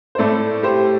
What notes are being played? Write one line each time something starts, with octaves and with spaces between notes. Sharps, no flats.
C5
A2 A3 E4 A4 D5
G4 C5